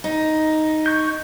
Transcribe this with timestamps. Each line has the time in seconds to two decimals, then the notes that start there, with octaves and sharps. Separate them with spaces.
0.04 D#4
0.86 C#6 G6